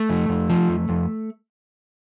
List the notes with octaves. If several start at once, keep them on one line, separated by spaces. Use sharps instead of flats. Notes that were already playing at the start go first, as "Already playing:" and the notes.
Already playing: A3
F2
F2
F3
F2
F2